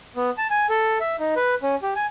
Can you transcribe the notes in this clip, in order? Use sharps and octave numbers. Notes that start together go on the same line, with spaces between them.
B3
A5
G#5
A4
E5
D#4
B4
C#4
G4
G#5